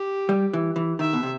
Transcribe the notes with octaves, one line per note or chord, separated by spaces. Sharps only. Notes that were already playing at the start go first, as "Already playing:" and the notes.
Already playing: G4
G3
E3
E3
D#3 E5
B2
C3